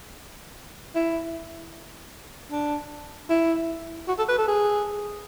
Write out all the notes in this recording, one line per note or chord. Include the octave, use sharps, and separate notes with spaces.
E4
D4
E4
F#4
A4
B4
A4
G#4